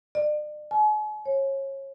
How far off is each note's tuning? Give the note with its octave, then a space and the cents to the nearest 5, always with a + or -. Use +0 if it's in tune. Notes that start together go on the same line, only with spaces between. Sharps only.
D5 +40
G#5 +40
C#5 -30